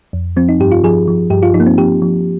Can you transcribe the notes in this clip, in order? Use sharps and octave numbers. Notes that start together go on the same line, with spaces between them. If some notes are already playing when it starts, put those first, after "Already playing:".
F2
F3 C4
D#4
G2 G4
F4
F3 G#4
F3
G2 G4
F4
F3 D#4
A#3
C4
F3 G4
F3